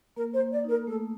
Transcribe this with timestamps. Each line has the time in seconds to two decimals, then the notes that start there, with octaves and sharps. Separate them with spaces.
0.16 A#3 A#4
0.34 C5
0.39 A#3
0.52 D5
0.64 D#4 A#4
0.87 A3 A4